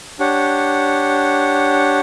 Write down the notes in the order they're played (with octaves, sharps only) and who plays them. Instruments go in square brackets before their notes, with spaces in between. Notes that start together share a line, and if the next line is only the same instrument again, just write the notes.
[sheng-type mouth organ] D4 G4 C#5 F#5